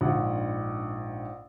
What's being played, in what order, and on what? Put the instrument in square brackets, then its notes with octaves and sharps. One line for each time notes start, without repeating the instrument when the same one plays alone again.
[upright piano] A#1 G#2 D4 F#5